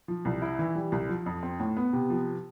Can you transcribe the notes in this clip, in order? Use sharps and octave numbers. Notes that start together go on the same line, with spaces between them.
F3
C2
E4
E3
G3
C2
F3
F2
C4
A2
B3
C3
F3